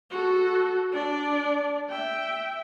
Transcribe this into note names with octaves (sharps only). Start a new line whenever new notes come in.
F#4 A4
D4 D5
E5 G5